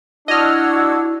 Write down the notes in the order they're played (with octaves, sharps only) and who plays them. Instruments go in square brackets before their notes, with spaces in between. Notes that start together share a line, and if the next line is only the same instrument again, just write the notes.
[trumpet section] D4 [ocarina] E4 [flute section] F#4 E6 G#6 [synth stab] D#5 F6